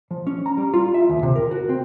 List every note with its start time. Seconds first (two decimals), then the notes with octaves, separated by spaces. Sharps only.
0.11 F3
0.27 C#4
0.46 A#5
0.57 G3
0.74 F4
0.94 E5
1.10 D#2
1.23 C3
1.36 A#4
1.51 F#4
1.69 C4